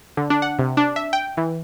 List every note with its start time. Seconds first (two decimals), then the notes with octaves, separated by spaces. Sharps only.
0.17 D3
0.30 D4
0.42 F#5
0.59 C3
0.77 D4
0.96 E5
1.13 G5
1.37 E3